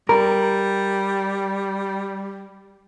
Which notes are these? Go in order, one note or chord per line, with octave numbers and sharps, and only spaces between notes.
G3 A#4